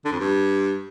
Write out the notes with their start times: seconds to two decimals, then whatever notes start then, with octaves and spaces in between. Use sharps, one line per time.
0.05 D3
0.12 F2
0.19 G2